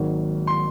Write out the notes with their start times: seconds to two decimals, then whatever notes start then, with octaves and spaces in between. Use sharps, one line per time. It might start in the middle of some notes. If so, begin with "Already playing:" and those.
Already playing: G#1 G#2 D#3 F#3 A#3
0.47 C6